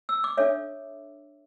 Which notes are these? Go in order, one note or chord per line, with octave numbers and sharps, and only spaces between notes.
E6
D6
D4 A4 C#5 E5